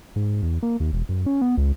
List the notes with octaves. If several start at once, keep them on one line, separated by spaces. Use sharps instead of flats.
G#2
E2
A#3
D#2
E1
F#2
C#4
B3
C#2